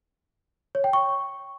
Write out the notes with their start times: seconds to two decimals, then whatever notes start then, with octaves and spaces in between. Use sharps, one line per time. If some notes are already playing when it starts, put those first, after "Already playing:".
0.75 C#5
0.84 G5
0.93 C#6